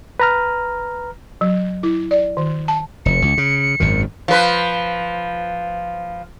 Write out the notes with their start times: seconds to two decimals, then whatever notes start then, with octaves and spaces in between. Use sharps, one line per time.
0.20 B4 A#5 F6
1.41 F#3
1.83 E4
2.11 D5
2.37 D#3
2.68 A5
3.06 F1 F2 C#7
3.22 C#2
3.38 C#3
3.80 G#1 F#2 D#3
4.28 F3 B4